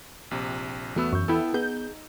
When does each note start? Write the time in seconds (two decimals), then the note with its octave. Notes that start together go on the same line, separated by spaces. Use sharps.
0.31 A#1 C3
0.96 E2 A3 B3 F#4 B5 E6
1.13 F#2 C#6 G6
1.28 B3 E4 A4 G5 E6
1.54 B3 D#4 G#4 G6